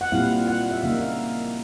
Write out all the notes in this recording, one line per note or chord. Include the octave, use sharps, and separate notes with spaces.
F#5
A#2 G3 C4 E4 F5
F#5
E5
C#3 F3 A#3 D#4 F5
F5